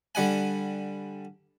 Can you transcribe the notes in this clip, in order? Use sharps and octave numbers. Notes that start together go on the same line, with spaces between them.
D3 G3 F#5 G#5